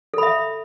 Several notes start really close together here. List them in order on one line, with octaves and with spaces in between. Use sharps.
A4 B5 E5